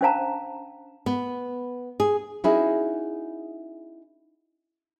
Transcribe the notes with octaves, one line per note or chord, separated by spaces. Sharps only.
C#4 D4 C5 F5 A5 A#5
B3
G#4
C#4 D#4 E4 F#4 G#4